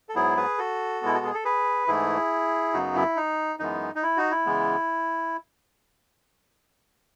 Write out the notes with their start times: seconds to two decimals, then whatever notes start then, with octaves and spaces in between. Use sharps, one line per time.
0.09 A4
0.15 G#2 F#3 B3 E4 G#4
0.37 G#4 B4
0.58 F#4 A4
1.01 B2 G#3 B3 E4
1.15 F#4
1.25 G#4
1.34 A4
1.45 G#4 B4
1.87 G#2 E3 A3 E4 G#4
2.73 F#2 C#3 F#3 B3 D#4 F#4
2.96 E4
3.16 D#4
3.59 F#2 E3 G#3 B3 D#4
3.95 D#4
4.03 E4
4.17 D#4 F#4
4.31 E4
4.46 C#3 E3 G#3 B3